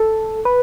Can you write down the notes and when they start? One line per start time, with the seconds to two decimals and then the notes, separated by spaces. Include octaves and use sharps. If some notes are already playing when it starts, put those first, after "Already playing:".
Already playing: A4
0.45 B4